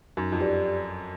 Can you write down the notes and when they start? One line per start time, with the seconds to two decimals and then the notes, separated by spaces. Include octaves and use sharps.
0.17 F#2 D#4
0.32 F2
0.40 G4 B4 D5